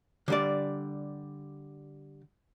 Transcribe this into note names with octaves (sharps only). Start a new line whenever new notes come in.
D3 G3 D5